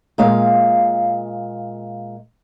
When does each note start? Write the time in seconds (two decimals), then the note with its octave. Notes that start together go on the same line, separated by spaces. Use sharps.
0.18 A#2 G#3 F5